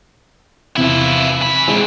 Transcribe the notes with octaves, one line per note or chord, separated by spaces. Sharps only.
E2 C3 F3 E4
E3 B5
D3 G#3 C4